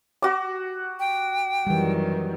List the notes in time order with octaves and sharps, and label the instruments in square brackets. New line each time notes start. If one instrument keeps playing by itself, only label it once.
[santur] F#4 D6
[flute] G5
[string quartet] F#2 D#3 F#3 [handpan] E3 G3